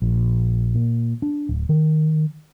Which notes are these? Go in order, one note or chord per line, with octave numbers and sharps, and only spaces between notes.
A#1
A#2
D4
D1
D#3